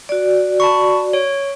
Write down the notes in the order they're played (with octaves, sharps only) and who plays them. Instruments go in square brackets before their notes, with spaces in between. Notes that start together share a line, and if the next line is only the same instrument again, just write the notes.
[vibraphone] F#4 D5
[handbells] A5 B5 C#6
C#5 D7